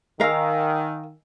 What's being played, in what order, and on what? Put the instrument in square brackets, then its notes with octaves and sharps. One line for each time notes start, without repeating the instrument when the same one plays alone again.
[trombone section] D#3 [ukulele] A#4 F5 [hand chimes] D#5 G#5 E6